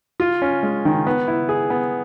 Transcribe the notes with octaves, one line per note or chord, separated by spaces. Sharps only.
F4
C#4
G#3
D#3
B3
E4
G#4
B3